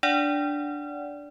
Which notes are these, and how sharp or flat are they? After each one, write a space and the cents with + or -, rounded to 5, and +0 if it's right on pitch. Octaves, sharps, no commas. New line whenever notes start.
D4 +0 D5 -20 F#5 +0